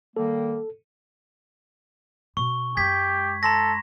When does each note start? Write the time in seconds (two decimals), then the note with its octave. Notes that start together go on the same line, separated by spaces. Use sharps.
0.17 D#3 G3 A#3 A4
2.37 B2 C#6
2.77 F#2 G#3 G4 G#6 B6
3.43 A4 A#5 C6 A#6